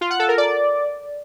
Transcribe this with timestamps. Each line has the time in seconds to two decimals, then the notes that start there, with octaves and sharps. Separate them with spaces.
0.01 F4
0.10 F#5
0.19 A4
0.29 A#4
0.38 D5